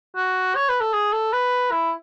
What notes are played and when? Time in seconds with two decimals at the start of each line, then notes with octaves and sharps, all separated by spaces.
0.16 F#4
0.55 C#5
0.69 B4
0.81 A4
0.93 G#4
1.13 A4
1.33 B4
1.71 E4